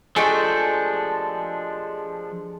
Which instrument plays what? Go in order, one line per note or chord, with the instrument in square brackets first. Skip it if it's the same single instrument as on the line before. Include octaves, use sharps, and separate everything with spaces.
[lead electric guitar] F3 D4 [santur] G#3 [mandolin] A3 G4 A4